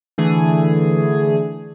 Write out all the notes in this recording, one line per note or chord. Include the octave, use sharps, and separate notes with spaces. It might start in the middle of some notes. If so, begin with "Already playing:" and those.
D3 E3 A3 G#4